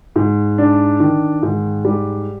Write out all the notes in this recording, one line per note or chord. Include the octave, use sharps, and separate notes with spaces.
G#2
D4
D#3
G#2
G3